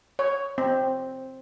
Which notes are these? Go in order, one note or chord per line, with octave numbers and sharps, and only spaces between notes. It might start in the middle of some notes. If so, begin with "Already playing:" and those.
C#5
C4